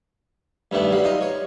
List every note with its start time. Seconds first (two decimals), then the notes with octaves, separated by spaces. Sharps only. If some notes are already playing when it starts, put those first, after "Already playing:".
0.71 G2 D#3 A3 B3
0.91 F#3 G3 F5
1.04 D#4 F4 D#5
1.21 C#5